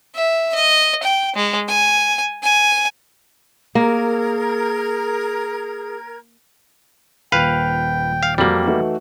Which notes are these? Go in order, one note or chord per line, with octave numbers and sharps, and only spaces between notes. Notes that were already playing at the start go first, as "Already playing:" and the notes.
E5
D#5
G5
G#3
G#5
G#5
A#3 G#4 A#4 G#6
D#1 A#2 B4 F5 G5 F7
F5
F2 F#3 G3 A#3 C4 F#7
E3 A3 D#4 F#4